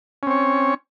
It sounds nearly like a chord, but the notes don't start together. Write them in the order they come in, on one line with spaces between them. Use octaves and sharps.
C#4 C4 C#5